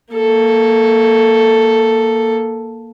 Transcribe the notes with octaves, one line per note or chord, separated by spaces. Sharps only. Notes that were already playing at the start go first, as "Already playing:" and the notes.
A#3 A4